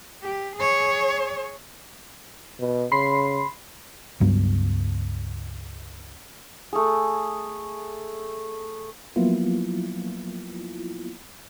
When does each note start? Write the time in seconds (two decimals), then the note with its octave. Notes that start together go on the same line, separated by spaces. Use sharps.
0.22 G4
0.56 G#4 C#5
2.60 B2
2.92 C#3 B5 C6 C7
4.20 C#2 G2 F#3 B3
6.73 A3 G#4
9.16 F3 F#3 A#3 B3 E4 F4